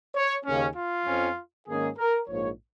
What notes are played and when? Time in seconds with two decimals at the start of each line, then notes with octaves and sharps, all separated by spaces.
0.15 C#5
0.46 D#2 C#3 A#3 C#4
0.76 F4
1.06 F2 F3 C#4
1.67 G#2 D#3 A#3 C#4 G#4
1.97 A#4
2.28 A#1 G#2 F3 A#3 C#5